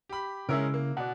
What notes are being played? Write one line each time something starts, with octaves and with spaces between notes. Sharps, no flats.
G4 B5
C#3 G#3 C#4 E4 A#4 E5
A#3
B2 D5 F#5